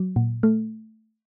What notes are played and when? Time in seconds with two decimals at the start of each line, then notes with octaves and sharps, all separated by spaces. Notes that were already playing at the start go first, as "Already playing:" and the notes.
Already playing: F#3
0.16 A#2
0.43 A3